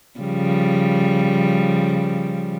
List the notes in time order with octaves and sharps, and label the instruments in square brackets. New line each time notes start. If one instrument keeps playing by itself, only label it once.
[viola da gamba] C#3 F3 G3